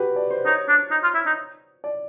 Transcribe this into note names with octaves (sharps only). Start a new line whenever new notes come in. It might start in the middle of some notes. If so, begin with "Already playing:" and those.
Already playing: F#4 G4 B4
D5
C5
D#4 C#5
D4
D#4
F4
E4
D#4
D5